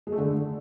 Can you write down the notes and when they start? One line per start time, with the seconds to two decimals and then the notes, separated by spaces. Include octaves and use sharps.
0.07 G#3
0.12 A3
0.18 D3